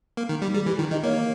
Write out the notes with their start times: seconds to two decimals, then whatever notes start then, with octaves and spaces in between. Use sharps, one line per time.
0.17 A#3
0.29 D#3
0.42 G3
0.54 G3 G#4
0.66 E3 G4
0.78 D#3 E4
0.91 D#3 D#5
1.03 A#3 C#5